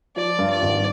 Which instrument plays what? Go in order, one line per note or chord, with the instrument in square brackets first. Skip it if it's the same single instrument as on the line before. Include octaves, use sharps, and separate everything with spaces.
[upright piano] F3 [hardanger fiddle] D5
[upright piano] G2
[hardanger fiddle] D5
[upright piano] G#1